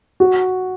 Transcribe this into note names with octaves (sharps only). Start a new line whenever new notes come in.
F#4